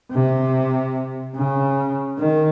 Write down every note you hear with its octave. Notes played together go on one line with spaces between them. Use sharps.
C3
C#3
D#3